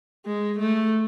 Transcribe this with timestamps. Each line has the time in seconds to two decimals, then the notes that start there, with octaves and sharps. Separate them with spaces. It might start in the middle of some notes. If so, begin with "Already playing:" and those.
0.26 G#3
0.59 A3